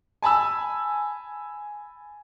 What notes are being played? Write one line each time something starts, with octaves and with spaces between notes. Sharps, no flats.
G#5 A5 B5 E6